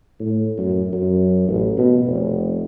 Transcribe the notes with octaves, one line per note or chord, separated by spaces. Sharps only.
A2
F#2
F#2
A1
B2
F1